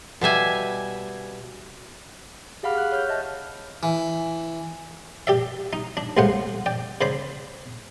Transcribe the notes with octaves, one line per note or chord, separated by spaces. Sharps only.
B2 G3 E5 G#5
G4 G#4 F5 F#5 B5 F6
F6 F#6
C#5 F6 G6
D#5 E5 A5
E3
G4 D5 E5
D#4
D4
C2 A2 G#3 C5 F5 F#5
D5 G5
C#3 C5 D5 B5